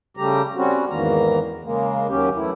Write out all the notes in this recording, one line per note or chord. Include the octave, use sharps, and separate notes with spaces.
C#3 G3 A3 G4 A#5
G3 C4 C#4 F#4
E2 G#2 D#3 E3 A#3 A#5
C#3 G#3 A#3
D#2 D#3 F#3 C#4 G4
F#2 E3 A3 E4